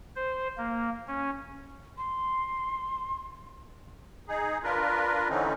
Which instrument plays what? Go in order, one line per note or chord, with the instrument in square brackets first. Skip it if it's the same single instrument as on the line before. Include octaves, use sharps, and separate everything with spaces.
[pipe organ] C5
A#3
C#4
[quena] C6
[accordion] D#4 G#4
D4 F4 A#4 B4
D3 E3 A3 C4 C#4 D#4